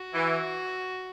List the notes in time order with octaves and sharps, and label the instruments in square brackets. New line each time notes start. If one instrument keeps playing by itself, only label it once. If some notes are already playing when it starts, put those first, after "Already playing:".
Already playing: [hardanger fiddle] F#4
[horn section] E3